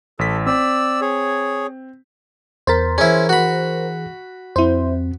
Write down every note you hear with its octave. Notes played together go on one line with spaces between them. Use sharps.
A1 A4 E6 B6
C4 D5 E6
G#4 C#5
E2 A#4 C5 A6 B6
E3 C#4 E4 G#4
F#4 B5
F2 C4 E4 C5